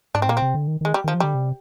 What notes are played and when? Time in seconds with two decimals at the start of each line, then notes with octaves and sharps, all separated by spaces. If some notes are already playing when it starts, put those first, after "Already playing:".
0.15 G#2 D4
0.22 C4
0.28 A#2 A#3
0.37 C4
0.42 C3
0.55 D3
0.68 D#3
0.81 D#3 G#3
0.94 G3
1.04 D#3 F3
1.14 F3
1.20 D3 G3
1.34 C3